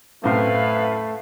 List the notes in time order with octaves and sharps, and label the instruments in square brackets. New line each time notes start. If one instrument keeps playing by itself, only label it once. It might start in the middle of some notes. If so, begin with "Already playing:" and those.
[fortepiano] F#2 A2 C4 [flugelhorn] A3 [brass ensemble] E4 B4 [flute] F5